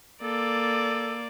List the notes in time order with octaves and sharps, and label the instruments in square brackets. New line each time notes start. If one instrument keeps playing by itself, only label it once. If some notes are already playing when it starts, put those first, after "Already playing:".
[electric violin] A#3 D5 [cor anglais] A4